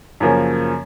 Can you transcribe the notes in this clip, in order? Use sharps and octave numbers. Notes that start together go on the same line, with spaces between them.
F#2 C#3 F3 A#3 C#4